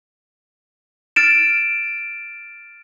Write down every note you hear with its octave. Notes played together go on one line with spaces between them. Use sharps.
F6 A6 D7 E7